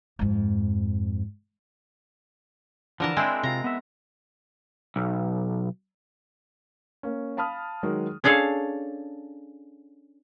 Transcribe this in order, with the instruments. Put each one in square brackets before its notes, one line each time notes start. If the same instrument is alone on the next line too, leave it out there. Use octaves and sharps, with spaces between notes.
[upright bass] F2 G#2
[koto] D3 A#4 A5 [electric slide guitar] E3 F3
[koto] G#3 C4 E4 [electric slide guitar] D4 G#4
[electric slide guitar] C3 F4 [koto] A#5
[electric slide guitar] B3 E5
[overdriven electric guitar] B1
[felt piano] A#3 C#4
F5 A5 B5 D#6 F6
D#3 F#3 G#3
[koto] C#4 D4 G#4 A4 F5